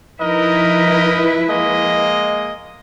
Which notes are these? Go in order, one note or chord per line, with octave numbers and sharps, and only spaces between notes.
F3 D#4 E4 A#4 B4 D#5
G#3 A#3 D#5